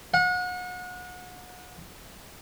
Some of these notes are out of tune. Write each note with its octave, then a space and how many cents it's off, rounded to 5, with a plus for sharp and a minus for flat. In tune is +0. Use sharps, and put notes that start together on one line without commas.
F#5 -35